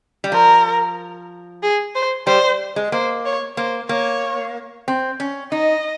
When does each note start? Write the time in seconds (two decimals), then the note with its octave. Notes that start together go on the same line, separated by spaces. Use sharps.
0.24 G3
0.32 F3 A#4
1.63 G#4
1.95 C5
2.27 G3 C5
2.76 G#3
2.92 A#3 C5
3.25 C#5
3.57 A#3 C5
3.89 A#3 C#5
4.88 C4
5.20 C#4
5.52 D#4 D#5